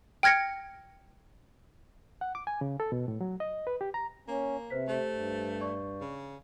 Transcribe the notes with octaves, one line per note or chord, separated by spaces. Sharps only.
G5 F6 G#6 A#6 C#7
F#5
D6
G#5
C#3
A4
B2
A2
F#3
D#5
B4
G4
A#5
A#3 C#4
C3 B4 C5 B6
A3 G4 C5
G2
D5 C#6
C#3